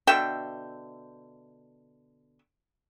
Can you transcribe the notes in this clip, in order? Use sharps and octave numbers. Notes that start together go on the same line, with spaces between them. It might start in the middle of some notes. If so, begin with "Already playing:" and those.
B2 D3 E5 G5